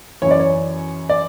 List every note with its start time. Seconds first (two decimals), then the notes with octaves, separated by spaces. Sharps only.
0.22 F#2 E3 C#5
0.31 D5
0.39 C#5
1.09 D5